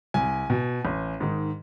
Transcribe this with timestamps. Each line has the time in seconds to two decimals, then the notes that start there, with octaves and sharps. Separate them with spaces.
0.14 C2 G#5
0.50 B2
0.85 A1
1.20 G#2 D#3